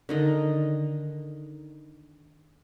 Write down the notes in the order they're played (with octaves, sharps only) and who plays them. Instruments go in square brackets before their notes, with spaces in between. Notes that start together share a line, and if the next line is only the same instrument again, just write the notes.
[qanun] D3 D#3 D#5